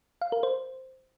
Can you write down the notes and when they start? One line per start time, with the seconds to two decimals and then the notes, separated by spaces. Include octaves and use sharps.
0.21 F5
0.32 A#4
0.43 C5